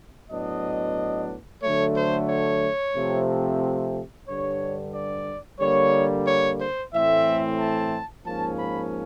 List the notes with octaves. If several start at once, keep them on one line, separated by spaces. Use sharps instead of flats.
A2 F#3 B3 D4 D#5
D3 F#3 A3 C#5
C5
C#5
C3 F3 A3 C4
G2 D3 G3 C#5
D5
D3 G3 A#3 C#5
C#5
C5
A2 E3 A3 C4 E5
A5
G#2 F3 A#3 C#4 A5
B5